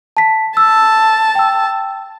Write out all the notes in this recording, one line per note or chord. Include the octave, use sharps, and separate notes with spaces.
A5 B6
A5 E6
G5 E6